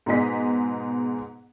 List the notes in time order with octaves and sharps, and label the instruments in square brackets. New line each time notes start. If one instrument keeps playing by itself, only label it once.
[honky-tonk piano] G#2 B2 G#4 D#5 B6